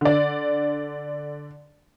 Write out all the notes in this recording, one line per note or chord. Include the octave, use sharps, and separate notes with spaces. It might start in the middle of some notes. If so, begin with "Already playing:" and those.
D3 D5